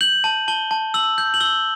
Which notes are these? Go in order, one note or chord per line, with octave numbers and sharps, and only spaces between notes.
G6 F#7
A5
A5 G7
A5
E6 F#7
G6
F#7
E6 G7